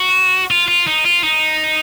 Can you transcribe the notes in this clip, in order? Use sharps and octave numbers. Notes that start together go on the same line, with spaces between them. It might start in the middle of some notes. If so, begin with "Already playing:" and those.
Already playing: F#4
F4
F4
D#4
F4
D#4